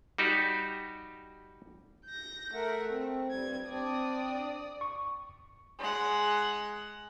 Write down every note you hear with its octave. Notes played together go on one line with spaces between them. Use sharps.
G3 D#4 F#4 G4
G6 A#6
A3 A#4 E5 F#5
C4
G2 G3 C4 G#6
C4 D4 D5 D#6
C#6
G#3 F#5